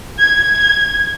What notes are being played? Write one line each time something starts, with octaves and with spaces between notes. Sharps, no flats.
G#6